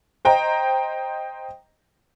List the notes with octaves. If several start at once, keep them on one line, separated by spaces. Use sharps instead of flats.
C5 D#5 G5 A#5